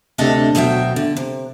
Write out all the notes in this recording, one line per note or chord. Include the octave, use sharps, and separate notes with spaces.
D2 C3 A3 D4 A4 D#5
D2 B2 F#3 E5 G5
D3
C3